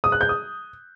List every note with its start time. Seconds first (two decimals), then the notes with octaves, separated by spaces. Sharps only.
0.04 D#6
0.12 F#6
0.21 G6
0.29 D#6